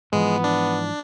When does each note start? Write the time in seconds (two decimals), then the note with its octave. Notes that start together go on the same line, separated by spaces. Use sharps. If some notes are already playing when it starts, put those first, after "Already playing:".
0.13 G#2 E3 F3 G#3 B3
0.44 D4